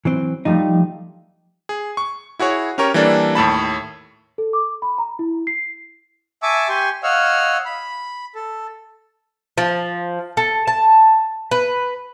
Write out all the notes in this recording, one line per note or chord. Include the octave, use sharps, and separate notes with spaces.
E3 F#3 C4
F3 G3 A3 D#4
G#4
C#6
E4 F#4 G#4 C#5
C#4 G4 A#4 C#5
E3 G3 A#3 D4 A4 D5
D#2 A2 A5 B5
A4
D6
B5
A#5
E4
C7
E5 G#5 A5 C#6 D6 E6
G4 G#5 C6 C#6
C#5 D#5 F5 F#5 E6 F6
B5
A4
F3
A4
A5
B4